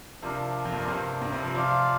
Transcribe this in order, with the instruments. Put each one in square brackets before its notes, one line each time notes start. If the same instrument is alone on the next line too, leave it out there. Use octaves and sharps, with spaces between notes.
[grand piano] C3 F3 [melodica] D4 A#4 D5 F5
[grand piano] F2
G2
A#2
G2 C3
G2
G2 C3
C3 F3
[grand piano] C3 F3 [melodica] F4 D5 F5